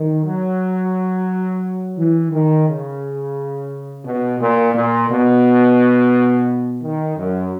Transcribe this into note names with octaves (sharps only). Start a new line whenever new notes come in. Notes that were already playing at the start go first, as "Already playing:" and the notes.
Already playing: D#3
F#3
E3
D#3
C#3
B2
A#2
A#2
B2
D#3
F#2